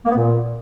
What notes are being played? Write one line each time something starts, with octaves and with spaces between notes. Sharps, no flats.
A#3
B3
A#2